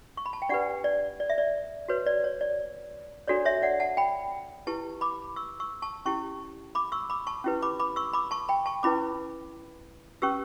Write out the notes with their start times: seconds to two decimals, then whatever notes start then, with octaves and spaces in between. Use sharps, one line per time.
0.17 C#6
0.26 B5
0.33 A5
0.42 G5
0.49 D4 G4 B4 D5 F#5
0.84 D5
1.20 D5
1.30 E5
1.38 D5
1.88 F#4 B4 C#5
2.06 D5
2.24 C#5
2.41 D5
3.28 D4 F#4 A4 C#5 D5
3.45 C#5 E5
3.62 D5 F#5
3.80 F#5 A5
3.97 G5 B5
4.67 E4 G4 B4 A5 C#6
5.01 B5 D6
5.36 C#6 E6
5.60 C#6 E6
5.82 A5 C#6
6.06 C#4 E4 G4 A5 C#6
6.75 B5 D6
6.92 C#6 E6
7.10 B5 D6
7.27 A5 C#6
7.44 C#4 E4 G4 B4
7.63 B5 D6
7.80 B5 D6
7.96 C#6 E6
8.13 B5 D6
8.31 A5 C#6
8.49 G5 B5
8.66 A5 C#6
8.83 C#4 E4 B4 B5 D6
10.22 C#4 G4 B4 C#6 E6